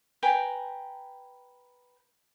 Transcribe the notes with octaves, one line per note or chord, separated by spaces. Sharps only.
B4 G5 G#5 A#5